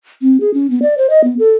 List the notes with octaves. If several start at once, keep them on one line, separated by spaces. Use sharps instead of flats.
C4
G#4
C#4
B3
D5
C5
D#5
B3
A4